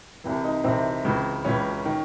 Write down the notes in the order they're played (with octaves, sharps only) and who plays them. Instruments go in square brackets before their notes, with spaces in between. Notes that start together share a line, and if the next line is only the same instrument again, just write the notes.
[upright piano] C2 C3 E3
D#4
C2 C3 E3 C4
C#2 C#3 E3
C#2 C#3 E3 C#4
D#3